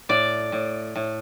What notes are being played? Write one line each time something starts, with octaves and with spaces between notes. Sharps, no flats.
A2 D5
A2
A2